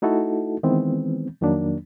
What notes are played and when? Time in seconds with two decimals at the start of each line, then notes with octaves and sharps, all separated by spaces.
0.02 A3 D#4 E4 F#4 A4
0.63 D#3 E3 G#3 B3 C4
1.41 F2 D#3 F#3 A#3 D4